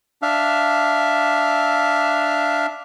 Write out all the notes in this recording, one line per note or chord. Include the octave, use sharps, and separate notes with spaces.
D4 E5 F5